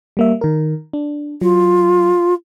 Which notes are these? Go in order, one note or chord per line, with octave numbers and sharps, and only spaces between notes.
G3 A#3 E5
D#3 A#4
D4
F#3 F4